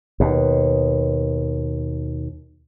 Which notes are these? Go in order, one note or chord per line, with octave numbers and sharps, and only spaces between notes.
D#2 B2